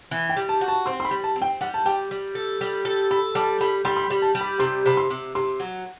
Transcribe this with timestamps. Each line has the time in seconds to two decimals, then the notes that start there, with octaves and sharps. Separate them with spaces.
0.11 E3
0.29 G5
0.36 G3
0.49 A5
0.61 F#4
0.68 A5
0.86 C4 C6
1.00 C6
1.05 B5
1.11 G3
1.24 A5
1.36 C4
1.42 G5
1.61 G3 F#5
1.74 A5
1.86 G3 G5
2.11 G3
2.35 A4
2.61 G3
2.85 A4
3.11 A4 B5
3.35 G3 A5
3.61 G3 B5
3.85 G3 C6
3.97 C6
4.04 B5
4.10 G3
4.22 A5
4.35 G3
4.41 B5
4.59 C3 C6
4.86 C3 B5
4.97 C6
5.10 C3
5.35 C3 C6
5.60 F#3